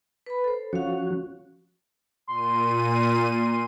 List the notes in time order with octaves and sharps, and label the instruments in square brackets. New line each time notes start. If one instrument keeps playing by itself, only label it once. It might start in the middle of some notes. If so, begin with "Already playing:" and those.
[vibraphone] B4 B5
A4 C5
[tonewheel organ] F3 C#4 F#4 [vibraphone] C#5 F5
[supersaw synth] A#2 D#7 [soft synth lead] C6